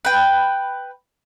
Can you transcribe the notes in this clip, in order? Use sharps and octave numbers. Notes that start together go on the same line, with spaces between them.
B4 G5